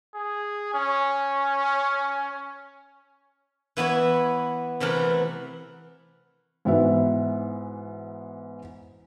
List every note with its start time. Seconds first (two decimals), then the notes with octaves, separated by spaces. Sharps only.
0.14 G#4
0.74 C#4
3.77 E3 B3 E4 C#5
4.80 C3 E3 A3 A#4 F#5
6.65 G#2 E3 B3 F#4 E5